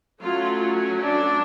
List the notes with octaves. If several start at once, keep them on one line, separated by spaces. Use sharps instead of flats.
F#3 A3 C#4 F4
D4